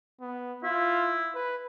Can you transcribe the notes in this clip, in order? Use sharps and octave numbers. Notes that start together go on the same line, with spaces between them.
B3
E4 F4
B4